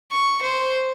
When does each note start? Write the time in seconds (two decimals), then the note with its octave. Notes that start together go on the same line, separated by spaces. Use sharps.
0.12 C#6
0.42 C5